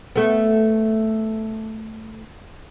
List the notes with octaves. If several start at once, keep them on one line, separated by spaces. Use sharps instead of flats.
A3 B3